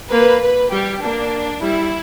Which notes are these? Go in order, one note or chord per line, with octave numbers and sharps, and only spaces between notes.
A#3 B4
B4
G3 G4
A#3 D4
G3 E4